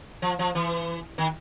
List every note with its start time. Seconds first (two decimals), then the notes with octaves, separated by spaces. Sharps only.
0.22 F3
0.39 F3
0.55 E3
1.18 D#3